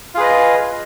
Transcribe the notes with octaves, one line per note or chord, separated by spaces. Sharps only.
F4 G#4 B4 D#5